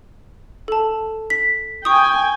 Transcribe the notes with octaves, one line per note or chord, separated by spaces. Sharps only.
A4 A5
B6
G5 G#5 C#6 D#6